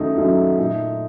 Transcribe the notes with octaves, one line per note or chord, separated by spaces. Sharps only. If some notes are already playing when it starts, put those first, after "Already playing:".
Already playing: F#2 D#3 F#3 A3 D#4
F#2 D#3 F#3 A3 D#4
A#2 A3 D#4